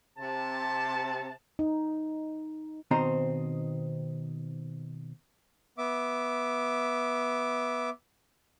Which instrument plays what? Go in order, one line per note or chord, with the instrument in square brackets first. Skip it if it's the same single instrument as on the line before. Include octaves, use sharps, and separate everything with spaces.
[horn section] C3 A5
[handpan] D#4
[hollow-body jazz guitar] B2 D#3 C4 D#4 C5 A#5
[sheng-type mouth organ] B3 E5 D6